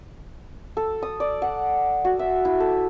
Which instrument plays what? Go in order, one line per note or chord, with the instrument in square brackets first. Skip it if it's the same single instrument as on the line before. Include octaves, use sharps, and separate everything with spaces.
[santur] A4
D#6
D5
F#5
F#4
E5
E4
A4